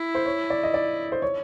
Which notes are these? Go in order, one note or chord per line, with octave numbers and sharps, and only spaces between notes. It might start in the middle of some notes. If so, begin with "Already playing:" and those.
Already playing: E4
C5
C#5
D5
D#5
D5
C5
C#5